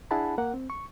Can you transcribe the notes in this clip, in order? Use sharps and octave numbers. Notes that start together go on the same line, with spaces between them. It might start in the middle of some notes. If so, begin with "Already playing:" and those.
D4 E4 G#4 F#5 A5 B5
A#3 A#4 F#5
C4
C#6